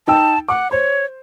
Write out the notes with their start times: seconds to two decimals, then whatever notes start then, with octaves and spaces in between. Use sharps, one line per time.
0.07 D#4 G5 A5 E6
0.48 F#5 D6
0.71 C5 C#5